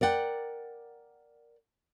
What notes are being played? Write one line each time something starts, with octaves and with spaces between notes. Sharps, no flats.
A#4 D5 F#5 G5